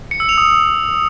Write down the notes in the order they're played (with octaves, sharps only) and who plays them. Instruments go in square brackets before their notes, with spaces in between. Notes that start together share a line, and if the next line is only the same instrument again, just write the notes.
[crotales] C#7
E6
F7
D#6